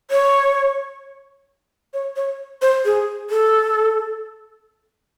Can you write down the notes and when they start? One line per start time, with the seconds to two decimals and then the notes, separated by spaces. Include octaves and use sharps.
0.11 C#5
1.94 C#5
2.16 C#5
2.62 C5
2.85 G#4
3.30 A4